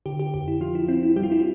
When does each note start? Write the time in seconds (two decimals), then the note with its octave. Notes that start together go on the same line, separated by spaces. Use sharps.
0.06 D3 G4
0.19 G4
0.34 F2 G4
0.48 E4
0.61 F3 F4
0.75 E4
0.88 C4 E4
1.03 E4
1.16 G3 G4
1.23 F4
1.32 E4
1.39 F4